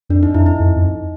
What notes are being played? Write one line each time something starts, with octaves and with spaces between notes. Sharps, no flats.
F2 D4
D#4
F2 E4
D#4
F2
F2